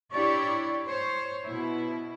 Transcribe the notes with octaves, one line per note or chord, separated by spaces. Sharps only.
D4 E4 G4 C#5 D5
C5 C#5
B2 E4